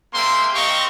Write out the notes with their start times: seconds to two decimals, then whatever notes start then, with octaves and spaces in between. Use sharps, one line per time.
0.14 G#3 A#3 C4 E5 C6
0.54 C4 G4 A#4 D#5 F5 C#6